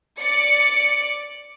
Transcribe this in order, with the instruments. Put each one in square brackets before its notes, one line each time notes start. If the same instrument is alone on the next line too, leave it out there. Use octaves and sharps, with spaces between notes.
[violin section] D5 C#7